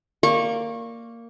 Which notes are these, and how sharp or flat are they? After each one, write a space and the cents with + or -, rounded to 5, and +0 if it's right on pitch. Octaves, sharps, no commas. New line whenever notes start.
A#3 -10 D5 +0 C#6 -25